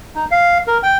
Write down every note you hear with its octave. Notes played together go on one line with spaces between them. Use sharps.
D#4
F5
A#4
G5